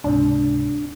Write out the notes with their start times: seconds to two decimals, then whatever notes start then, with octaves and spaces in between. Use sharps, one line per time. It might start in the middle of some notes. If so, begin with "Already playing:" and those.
0.04 C#2 G#2 C3 D4